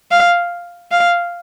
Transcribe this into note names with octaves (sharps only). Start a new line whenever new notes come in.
F5
F5